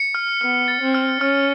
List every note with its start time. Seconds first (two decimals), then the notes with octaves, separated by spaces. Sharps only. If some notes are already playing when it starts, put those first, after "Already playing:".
Already playing: C#7
0.15 F6
0.41 B3 F6
0.68 A6
0.81 C4
0.95 F6
1.21 C#4 F6